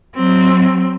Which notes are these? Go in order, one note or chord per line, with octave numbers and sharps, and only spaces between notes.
F#3 C4